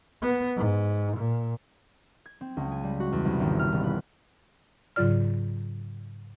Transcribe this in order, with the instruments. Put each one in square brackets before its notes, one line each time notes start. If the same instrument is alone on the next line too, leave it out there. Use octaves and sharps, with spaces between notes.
[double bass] B3
G#2
A#2
[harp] G#6
C4
C#2
G#5
G3
F#4
E2
C2
G#1
F6
E1
B4
[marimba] G#2 C#3 F#3 F4 D5 F6